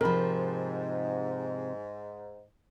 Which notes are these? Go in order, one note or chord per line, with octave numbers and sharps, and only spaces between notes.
G#2 C3 F3 A#4 B5